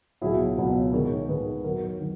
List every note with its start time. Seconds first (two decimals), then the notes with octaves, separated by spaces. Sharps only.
0.21 C#2 B2 F#3 E4 G#4
0.57 C#2 B2 F#3
0.93 G#2 D#3 G#3 A#4 C#5
1.28 G#2 D#3 G#3 G#4 B4
1.64 F#2 D#3 F#3 F#4 A#4
2.00 D#3 F#3